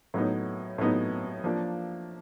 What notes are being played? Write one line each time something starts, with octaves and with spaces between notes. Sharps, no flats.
A2 F#3 B3 D#4
A2 F#3 B3 D#4
F3 A#3 D4